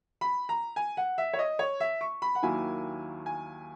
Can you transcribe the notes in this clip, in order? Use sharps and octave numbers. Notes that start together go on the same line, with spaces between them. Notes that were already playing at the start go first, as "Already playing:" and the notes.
B5
A#5
G#5
F#5
E5
C#5
D#5
C#5
E5
C#6
B5
F#5
D#2 D#3 F#3 A#3 E4 G#5
G#5